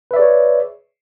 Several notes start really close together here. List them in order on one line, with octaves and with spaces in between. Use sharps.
B4 E5 D5 G#4 C#5